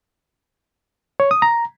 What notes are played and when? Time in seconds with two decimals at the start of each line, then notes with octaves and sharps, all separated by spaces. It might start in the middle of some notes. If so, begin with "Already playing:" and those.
1.20 C#5
1.31 D#6
1.42 A#5